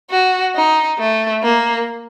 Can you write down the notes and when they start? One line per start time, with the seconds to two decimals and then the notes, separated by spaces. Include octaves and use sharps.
0.11 F#4
0.55 D#4
0.99 A3
1.43 A#3